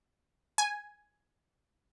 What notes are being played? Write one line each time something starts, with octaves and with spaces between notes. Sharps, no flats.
G#5